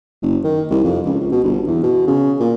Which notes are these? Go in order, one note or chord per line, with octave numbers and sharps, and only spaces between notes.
F#1
D#3
C2
F2
C#2
C#2
B2
G1
E2
B2
C#3
A#2